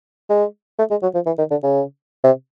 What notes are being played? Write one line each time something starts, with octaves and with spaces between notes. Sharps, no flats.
G#3
A3
G#3
F#3
F3
E3
D#3
D3
C#3
C3